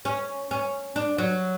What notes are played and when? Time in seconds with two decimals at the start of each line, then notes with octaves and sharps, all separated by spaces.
0.05 C#4
0.51 C#4
0.96 D4
1.18 F#3